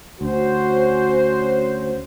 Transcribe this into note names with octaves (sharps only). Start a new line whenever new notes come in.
D2 C#4 F#4 C5